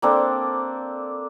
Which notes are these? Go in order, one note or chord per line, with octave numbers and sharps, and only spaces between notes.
A#3 C4 D4 A4